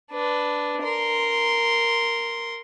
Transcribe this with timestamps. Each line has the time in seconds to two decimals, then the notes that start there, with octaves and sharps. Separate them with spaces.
0.12 D4 B4
0.82 A#4 C6